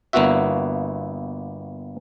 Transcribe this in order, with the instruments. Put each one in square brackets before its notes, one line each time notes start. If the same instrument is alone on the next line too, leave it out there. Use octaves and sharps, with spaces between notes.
[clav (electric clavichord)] G1 A#3 B3 E4 F#4 E5